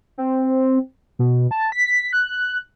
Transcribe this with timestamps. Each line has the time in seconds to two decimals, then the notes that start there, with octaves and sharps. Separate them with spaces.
0.18 C4
1.19 B2
1.51 A5
1.72 B6
2.13 F#6